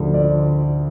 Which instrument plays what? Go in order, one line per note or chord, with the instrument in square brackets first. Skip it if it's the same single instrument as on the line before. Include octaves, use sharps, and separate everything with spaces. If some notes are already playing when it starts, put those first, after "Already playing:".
Already playing: [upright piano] D2 D3 F3
D5